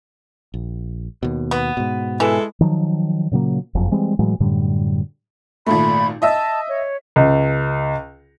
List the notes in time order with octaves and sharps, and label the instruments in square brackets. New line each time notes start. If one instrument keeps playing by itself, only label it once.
[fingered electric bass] A#1
D#2 B2
[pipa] B3
[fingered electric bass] G#2 B2
[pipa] E3 [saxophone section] G#3 E4 A4
[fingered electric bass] D#3 F3 F#3
A#2 C#3 F#3 A#3
F#1 F2
E3 G3 G#3 C4
A2 E3 F#3 G#3
F#2 A2 D3 G3
[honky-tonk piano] G#1 A#2 A3 [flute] B5
[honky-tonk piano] D#5 E5 E6 [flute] A5
[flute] C#5
[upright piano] C#2